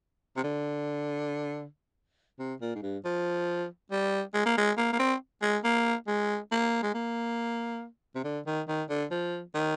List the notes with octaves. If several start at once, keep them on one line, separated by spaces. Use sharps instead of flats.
C3
D3
C3
A#2
G#2
G2
F3
G3
G#3
A#3
G#3
A#3
A#3
C4
G#3
A#3
G#3
A#3
G#3
A#3
C3
D3
D#3
D#3
D3
F3
D#3